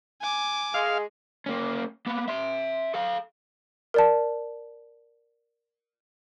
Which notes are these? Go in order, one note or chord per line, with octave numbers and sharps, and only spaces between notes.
G#5 D6
G#3 F5
A#3 C#4
A#3 B3
E5 C6
A4 F5
A#4 D5 A5